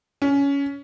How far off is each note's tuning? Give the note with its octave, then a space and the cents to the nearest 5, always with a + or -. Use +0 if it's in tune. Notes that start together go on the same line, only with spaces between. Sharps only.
C#4 +15